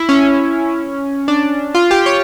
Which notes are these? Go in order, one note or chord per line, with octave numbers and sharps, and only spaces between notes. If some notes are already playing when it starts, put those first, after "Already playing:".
Already playing: E4
C#4
D4
F4
G4
C#5